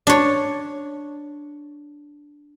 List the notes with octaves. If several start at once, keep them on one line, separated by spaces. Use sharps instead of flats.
D4 C#5